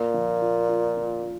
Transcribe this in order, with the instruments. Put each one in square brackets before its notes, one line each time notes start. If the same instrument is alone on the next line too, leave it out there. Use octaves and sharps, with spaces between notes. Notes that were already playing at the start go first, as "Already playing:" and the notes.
Already playing: [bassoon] A#2 [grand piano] A#3
[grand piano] F3
F4
F4
F3
F4